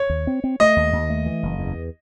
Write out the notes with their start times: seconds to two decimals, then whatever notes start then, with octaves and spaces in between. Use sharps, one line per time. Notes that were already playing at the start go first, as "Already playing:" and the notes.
Already playing: C#5
0.09 D#2
0.27 C4
0.44 C4
0.60 A3 D#5
0.76 D#2
0.93 D#2
1.10 A3
1.26 E3
1.43 F#1
1.59 E2